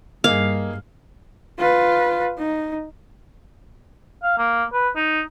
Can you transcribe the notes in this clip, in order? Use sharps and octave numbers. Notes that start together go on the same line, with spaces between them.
G2 A#3 D#4 G#4 F5
F4 B4
D#4
F5
A#3
B4
D#4